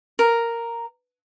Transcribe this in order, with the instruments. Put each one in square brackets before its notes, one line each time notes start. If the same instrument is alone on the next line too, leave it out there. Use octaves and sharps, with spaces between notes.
[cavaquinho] A#4